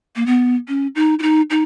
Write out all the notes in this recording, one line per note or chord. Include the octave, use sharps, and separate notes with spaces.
A#3
B3
C#4
D#4
E4
D#4
D#4